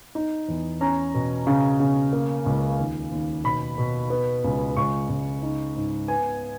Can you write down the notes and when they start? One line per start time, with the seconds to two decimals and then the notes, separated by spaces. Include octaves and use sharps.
0.15 D#4
0.48 E2
0.81 C#4 A#5
1.14 B2
1.47 C#3
1.80 C#3
2.13 A#3
2.46 C#2
2.79 D#2
3.12 D#2
3.44 B2 B5
3.78 B2
4.10 B3
4.44 C#2
4.77 C#2 C#6
5.09 C#2
5.42 D#4
5.76 G#2
6.08 B3 G#5